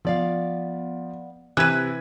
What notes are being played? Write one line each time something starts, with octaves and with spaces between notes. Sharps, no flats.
F3 B3 D5 F5
C3 E3 B4 F#6 G#6 D#7